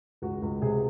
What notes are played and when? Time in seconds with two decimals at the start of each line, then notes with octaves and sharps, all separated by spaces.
0.22 C#2 F#4
0.42 C#2
0.62 C3 G#4